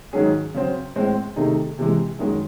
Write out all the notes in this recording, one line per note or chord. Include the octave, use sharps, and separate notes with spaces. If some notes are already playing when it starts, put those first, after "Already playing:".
G#2 D#3 F#3 C#4 G#4
C#3 F#3 C4
A2 G#3 C4
C3 D#3 A3 D#4 G#4
C3 E3 G#3
F#2 D#3 G#3